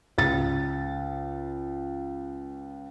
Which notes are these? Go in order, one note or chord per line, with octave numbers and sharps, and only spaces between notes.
C#2 A6